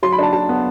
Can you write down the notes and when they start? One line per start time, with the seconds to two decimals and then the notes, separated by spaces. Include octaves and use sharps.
0.03 F#3 C6
0.13 B5
0.19 D4 A5
0.33 F#3 A5
0.49 B3